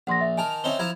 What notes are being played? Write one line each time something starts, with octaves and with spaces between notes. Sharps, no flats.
A#1 F#5 C6 A#6
E5
D#3 A#4 G#5 A5
C4 C#4 D#4 E5 G7
F3 E4 A#5 G#6